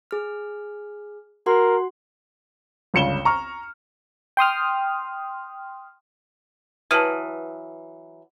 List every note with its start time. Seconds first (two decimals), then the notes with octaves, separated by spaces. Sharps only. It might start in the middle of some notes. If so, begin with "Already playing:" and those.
0.11 G#4 F6
1.46 F#4 A#4 F#5 C6
2.94 G1 C#2 C#3 C#7 E7 G7
3.25 A#5 C#6 F6
4.37 G5 C6 D#6 F6
6.91 E3 F#3 B4 A5 D#6 F6 D#7